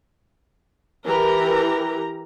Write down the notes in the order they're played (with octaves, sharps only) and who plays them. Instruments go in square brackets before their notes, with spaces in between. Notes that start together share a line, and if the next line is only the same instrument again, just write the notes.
[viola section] E3 G4 A#4 A#5